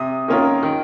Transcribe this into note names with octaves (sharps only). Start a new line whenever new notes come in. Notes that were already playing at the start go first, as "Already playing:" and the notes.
Already playing: C3 D#6
D#3 A#3 C#4 F4
D#3